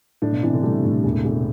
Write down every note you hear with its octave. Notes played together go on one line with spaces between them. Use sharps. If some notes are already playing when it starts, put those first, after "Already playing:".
A2 D4
B2
C3 E3
D3
G3 A3
A2
E1
E1